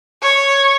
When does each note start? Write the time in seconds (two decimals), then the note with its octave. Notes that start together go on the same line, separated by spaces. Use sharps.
0.22 C#5